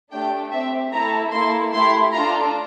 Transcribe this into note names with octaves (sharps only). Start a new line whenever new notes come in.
A3 D4 G4 G5
C4 G4 E5
A3 E4 A4 A#5
A#3 E4 A4 C6
A3 E4 G4 C6
D4 F4 A4 A#5